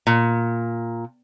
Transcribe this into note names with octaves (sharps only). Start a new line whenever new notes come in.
A#2